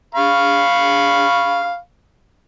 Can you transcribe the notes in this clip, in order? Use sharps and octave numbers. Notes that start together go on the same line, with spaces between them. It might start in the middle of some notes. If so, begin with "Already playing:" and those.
F5 B5 C#6